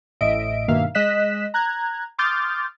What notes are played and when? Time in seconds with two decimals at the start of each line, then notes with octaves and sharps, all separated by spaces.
0.21 A1 A2 D#5 E5 D7
0.68 G2 B2 D#3 A#3 E5 F5
0.95 G#3 D#5 F#6 B6 E7
1.54 A#5 F#6 G#6
2.18 C6 D6 D#6 F6 G6 A6